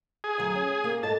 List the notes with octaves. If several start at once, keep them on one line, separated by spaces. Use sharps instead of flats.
G#4
D2 F#3
C#4
A#3
G#2 A4 D#5 A5